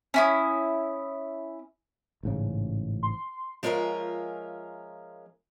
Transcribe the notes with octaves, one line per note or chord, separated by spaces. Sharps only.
C#4 E4 D#6
A1 G#2 C#3
C6
F3 G#3 C#4 F4 A#4 E5